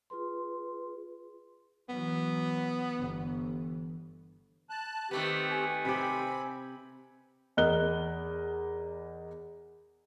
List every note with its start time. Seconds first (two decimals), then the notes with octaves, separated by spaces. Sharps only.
0.10 F4 G#4 B4 C6
1.89 E3 F#3 B3
2.96 G1 E3
4.70 A5 F#6
5.11 D#3 A3 B3 C4 G4
5.52 G#5
5.85 C3 C4 G4 B5
7.57 E2 A#4 D#5 F#6 G7